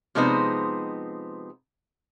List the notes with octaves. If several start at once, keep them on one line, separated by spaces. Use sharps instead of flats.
C3 F3 G#3 B3 D#4 C5